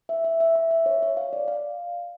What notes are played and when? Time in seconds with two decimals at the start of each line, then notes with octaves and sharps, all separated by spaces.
0.09 E5
0.24 E5
0.40 E5
0.55 E5
0.71 E5
0.86 C#5
1.03 C#5
1.17 F5
1.33 D5
1.48 F5